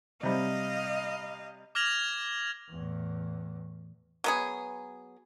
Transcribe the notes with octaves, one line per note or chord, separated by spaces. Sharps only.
C3 G3 D#5 F5
D6 F6 G#6 A#6 F7 F#7
E2 A2
F#3 B3 G#4